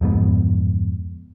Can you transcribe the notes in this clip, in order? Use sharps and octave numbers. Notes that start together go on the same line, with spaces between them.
D1 F2 G#2 B3